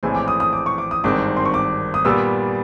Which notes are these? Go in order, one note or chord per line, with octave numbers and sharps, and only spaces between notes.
A#1 A2 E3 G#3 C4 G#5
D6
D#6
D#6
D6
C#6
D6
D#6
G#1 G2 D#3 G#3 C4 D6
C6
C#6
D6
D#6
A#2 G3 B3 E6